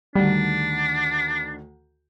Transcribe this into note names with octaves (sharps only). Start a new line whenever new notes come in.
D2 D3 D#3 G3 D4